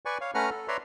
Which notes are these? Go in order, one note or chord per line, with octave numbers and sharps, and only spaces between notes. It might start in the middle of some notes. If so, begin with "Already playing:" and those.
B4 D5 G#5 C#6
C#5 F5
A3 C#4 B4 F#5 A#5 F6
A4
B4 C#5 D5 E5 A#5 C6